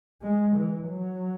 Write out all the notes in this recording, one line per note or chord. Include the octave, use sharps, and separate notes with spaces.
G#3
E3
F#3